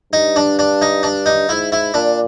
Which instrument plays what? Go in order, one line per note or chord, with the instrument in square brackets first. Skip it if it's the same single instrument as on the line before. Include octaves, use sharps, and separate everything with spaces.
[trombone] G2 [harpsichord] D#4
[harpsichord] D4
D4
D#4
D4
D#4
[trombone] G#2 [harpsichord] E4
[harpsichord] E4
[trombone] A#2 [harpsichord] D4